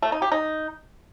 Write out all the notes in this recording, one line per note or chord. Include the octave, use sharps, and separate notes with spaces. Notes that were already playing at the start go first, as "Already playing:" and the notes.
A3
D#4
G4
D#4